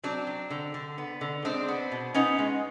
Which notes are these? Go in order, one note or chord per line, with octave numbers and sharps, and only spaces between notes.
F#3 C4 D4
F#3
D3
D3
B3
D3
G#3 C4 D4
B3
B2
B3 C#4 D#4
G#3